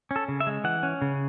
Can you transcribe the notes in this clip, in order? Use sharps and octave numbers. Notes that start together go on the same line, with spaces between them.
C#4
A4
C#3
E5
G#3
E3 F#5
C#4
C#3